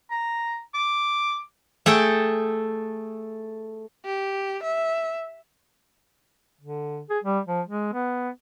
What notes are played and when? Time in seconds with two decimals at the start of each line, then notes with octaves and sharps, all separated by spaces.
0.11 A#5
0.74 D6
1.86 A3 G#4 A4 G5
4.05 G4
4.63 E5
6.61 D3
7.10 G#4
7.24 G3
7.47 F3
7.68 G#3
7.93 B3